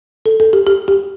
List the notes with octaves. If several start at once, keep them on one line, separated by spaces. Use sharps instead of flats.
A4
A4
G4
G4
G4